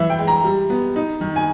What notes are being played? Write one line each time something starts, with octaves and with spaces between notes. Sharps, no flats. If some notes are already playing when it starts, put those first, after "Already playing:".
Already playing: E3 E5
G5
G#3
A#5
G3
B3
D#4
D#3
G#5